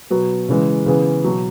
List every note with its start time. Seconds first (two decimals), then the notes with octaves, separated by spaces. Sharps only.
0.10 B2 F#3 B3
0.49 C#3 E3 G#3
0.86 C#3 E3 B3 G#4
1.24 B2 F#3